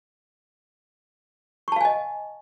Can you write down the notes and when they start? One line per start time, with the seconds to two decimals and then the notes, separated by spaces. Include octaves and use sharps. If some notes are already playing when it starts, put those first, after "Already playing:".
1.68 C#6
1.72 A5
1.76 F5
1.81 G#5
1.85 D#5